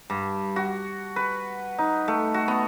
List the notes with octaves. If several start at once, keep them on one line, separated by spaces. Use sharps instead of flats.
G2
F#4
B4
D#4
A3
F#4
B3